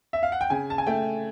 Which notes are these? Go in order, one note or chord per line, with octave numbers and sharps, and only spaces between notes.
E5
F5
F#5
G5
C#3 G#5
A5
G#5
A3 G5